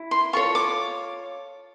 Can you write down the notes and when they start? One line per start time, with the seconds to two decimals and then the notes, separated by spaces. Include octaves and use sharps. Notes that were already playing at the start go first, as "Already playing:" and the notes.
Already playing: E4
0.11 C6
0.33 F4 A4 C#5 C#6
0.55 D6